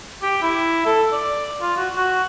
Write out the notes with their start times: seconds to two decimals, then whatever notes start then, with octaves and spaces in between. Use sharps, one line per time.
0.22 G4
0.42 E4
0.86 A4
1.13 D5
1.61 F4
1.77 F#4
1.96 F#4